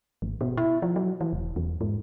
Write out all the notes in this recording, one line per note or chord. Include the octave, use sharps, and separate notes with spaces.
G#1
B2
E4
F3
F#3
E3
E1
E2
G#2